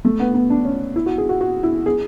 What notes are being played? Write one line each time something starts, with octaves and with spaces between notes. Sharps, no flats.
A3
B3
B3
D4
C#4
E4
F#4
G#4
F#4
F#4
E4
G#4